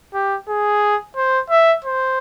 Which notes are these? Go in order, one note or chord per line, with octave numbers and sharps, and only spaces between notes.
G4
G#4
C5
E5
C5